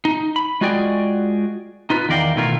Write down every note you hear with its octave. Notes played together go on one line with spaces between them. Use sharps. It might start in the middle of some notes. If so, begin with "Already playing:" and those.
D#4
B5
G#3 F4 F#4 G#4 D5 G5
D#4 F4 B4
E2 D#3 A#4 D5 F5 G5
B2 D#3 A3 E4 F4 A#4